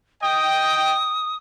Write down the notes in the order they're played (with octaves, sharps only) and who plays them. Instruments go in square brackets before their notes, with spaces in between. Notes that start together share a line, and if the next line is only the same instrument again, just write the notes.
[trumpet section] D#5 G5 [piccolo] D#6